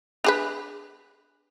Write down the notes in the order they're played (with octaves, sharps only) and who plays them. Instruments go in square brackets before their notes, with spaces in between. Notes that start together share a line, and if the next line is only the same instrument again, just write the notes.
[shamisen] D4 G#4 B4